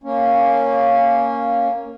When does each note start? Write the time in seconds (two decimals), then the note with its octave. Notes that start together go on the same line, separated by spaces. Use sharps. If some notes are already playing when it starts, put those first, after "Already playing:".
0.04 A#3 C#4